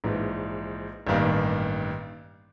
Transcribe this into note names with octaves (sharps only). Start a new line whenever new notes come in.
A#1 G#2 E3
A1 G2 D#3 G3 A#3